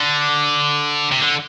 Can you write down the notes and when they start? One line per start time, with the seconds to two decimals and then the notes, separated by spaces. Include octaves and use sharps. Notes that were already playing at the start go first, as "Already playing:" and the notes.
Already playing: D3
1.12 C3
1.21 D3